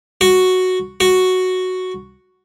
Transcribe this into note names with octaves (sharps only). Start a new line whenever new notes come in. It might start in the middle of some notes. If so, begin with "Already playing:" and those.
F#4
F#4